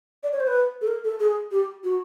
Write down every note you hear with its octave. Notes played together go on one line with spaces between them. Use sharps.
D5
C#5
C5
B4
A4
A#4
A4
G#4
G4
F#4